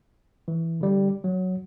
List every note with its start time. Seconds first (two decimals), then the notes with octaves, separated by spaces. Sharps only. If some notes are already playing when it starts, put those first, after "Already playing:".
0.48 E3
0.81 D3 G3
1.24 F#3